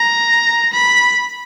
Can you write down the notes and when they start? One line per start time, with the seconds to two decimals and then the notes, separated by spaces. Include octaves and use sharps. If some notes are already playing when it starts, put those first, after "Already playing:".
Already playing: A#5
0.73 B5